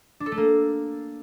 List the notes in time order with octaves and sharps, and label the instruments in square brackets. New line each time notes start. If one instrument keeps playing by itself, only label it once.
[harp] D4
A4
A3
A#3